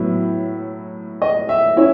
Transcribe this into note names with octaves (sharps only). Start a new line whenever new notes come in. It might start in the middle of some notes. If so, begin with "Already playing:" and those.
Already playing: A2 F#3 B3 E4
D#5
E5
C#4 E4 E5